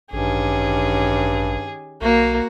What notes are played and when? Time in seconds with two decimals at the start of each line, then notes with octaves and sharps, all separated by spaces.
0.13 A1 G2 D#3 C#4 G4 G#4
2.01 B1 A#3 F#4